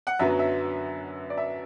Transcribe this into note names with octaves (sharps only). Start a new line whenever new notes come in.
F#5
F#2 D3 F#3 B3 E5
E5
D5
E5